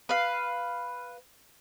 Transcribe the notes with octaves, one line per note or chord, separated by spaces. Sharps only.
B4 F5